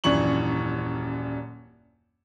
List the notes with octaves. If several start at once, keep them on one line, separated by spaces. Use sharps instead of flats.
D#1 F#2 E3 D4 C#6 F#7